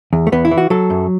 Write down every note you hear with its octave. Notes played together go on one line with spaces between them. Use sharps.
E2
A3
E2 B3
E4
E3
F#4
F#3 A4
F#2